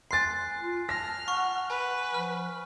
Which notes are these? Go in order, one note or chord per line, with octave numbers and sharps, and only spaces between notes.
G#5 C6 F#6 A6 C7
F4
A5 F6 A#6
F#5 C#6
B4 G#5
F3 F6